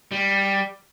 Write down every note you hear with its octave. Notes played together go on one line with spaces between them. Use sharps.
G3